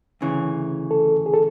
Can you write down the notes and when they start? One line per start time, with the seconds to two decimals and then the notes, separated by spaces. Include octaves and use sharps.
0.21 D2 C#3 E3
0.91 A4
1.26 G#4
1.34 A4